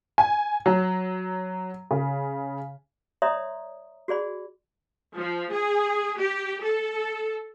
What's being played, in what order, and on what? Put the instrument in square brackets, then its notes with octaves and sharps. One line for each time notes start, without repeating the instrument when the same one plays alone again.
[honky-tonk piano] G#5
F#3
C#3
[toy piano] C#5 D5 E5 A#5 C6 D#6
F#4 G#4 D5 B5
[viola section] F3
G#4
G4
A4